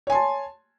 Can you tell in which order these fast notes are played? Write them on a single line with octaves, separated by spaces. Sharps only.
C#5 G#5 C6 A5